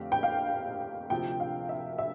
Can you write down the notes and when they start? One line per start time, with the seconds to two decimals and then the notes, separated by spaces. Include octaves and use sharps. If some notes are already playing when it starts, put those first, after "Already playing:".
Already playing: F2 D3 A3 C4 G4 F5
0.12 G5
0.23 F5
1.10 D2 C3 F3 G5
1.40 F5
1.69 E5
1.98 E5